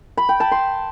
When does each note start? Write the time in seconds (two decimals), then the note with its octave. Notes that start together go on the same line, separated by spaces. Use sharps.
0.18 B5
0.29 G5
0.40 A5
0.52 C6